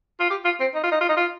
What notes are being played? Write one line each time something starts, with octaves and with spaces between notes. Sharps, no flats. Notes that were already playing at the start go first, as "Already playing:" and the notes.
F4
G4
F4
C4
D#4
F4
D#4
F4
D#4
F4